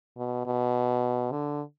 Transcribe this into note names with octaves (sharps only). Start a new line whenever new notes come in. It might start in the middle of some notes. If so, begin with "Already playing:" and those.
B2
B2
D3